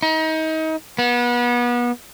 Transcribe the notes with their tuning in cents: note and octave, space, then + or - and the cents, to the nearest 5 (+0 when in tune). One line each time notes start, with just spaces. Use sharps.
D#4 +30
B3 -30